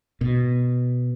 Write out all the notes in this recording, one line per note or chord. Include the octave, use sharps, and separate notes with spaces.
B2